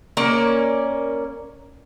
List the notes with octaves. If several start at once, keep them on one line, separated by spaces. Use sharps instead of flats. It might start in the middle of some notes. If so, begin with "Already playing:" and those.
A#3 C#4 D5